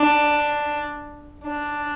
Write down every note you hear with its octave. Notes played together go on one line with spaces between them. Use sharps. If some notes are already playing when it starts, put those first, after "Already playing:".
Already playing: D4
D4